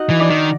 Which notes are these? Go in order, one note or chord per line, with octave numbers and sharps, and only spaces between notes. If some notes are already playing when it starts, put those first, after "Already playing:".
Already playing: D#4 F#4 D#5 F#5
E3
D4 D5
D#3